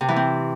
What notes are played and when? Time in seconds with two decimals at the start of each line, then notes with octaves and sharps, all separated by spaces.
0.01 C3
0.08 E3
0.16 C4